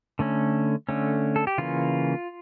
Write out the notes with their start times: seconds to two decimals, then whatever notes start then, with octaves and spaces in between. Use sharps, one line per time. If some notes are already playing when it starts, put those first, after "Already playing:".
0.19 D3 A3 C#4
0.89 D3 A3 C#4
1.36 A4
1.47 G4
1.58 C#3 E3 A#3 C#4 F4